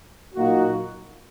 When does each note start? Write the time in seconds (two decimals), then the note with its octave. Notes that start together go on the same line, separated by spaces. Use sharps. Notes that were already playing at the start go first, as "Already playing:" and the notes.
0.35 A#2 F#3 A#3 D#4 F#4